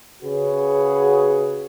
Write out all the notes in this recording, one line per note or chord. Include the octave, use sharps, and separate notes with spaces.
C#3 F#4 G#4 B4